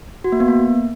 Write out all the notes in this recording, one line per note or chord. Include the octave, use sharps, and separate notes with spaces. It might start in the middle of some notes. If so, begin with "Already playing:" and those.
F#4
A#3
B3
A#3